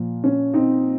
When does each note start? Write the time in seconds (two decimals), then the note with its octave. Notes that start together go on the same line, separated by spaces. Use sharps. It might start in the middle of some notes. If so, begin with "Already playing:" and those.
Already playing: A#2 F3
0.24 C#4
0.54 C4 D#4